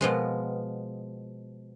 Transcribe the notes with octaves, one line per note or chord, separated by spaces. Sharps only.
B2 F3 G#3